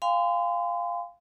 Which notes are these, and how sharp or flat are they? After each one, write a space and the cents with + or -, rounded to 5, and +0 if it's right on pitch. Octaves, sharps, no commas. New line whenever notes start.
F5 +0 G#5 -45 C6 -35